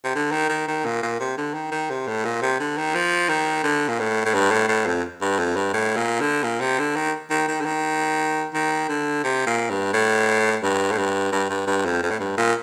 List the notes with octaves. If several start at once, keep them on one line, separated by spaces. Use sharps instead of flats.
C3
D3
D#3
D#3
D#3
A#2
A#2
C3
D3
D#3
D#3
C3
A2
A#2
C3
D3
D#3
F3
D#3
D3
A#2
A2
A2
G2
A2
A2
F2
G2
F2
G2
A2
A#2
D3
A#2
C3
D3
D#3
D#3
D#3
D3
D#3
D#3
D3
C3
A#2
G2
A2
G2
A2
G2
G2
G2
G2
F2
F2
A2
G2
A#2